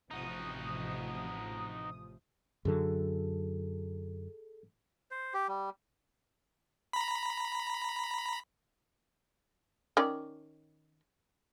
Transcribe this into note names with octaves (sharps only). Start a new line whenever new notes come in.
A1 C3 F3 D#4 F#4 D#6
F#2 D3 F#3 G#4 A4
C5
G4
G3
A#5 B5
D#3 C#4 D5